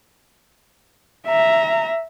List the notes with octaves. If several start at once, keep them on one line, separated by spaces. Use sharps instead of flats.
E5 A#5